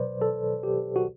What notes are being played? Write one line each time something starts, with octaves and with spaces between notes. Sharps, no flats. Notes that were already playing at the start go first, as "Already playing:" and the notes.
Already playing: B2 F#3 B4 C5 D5
A4
G4
F#4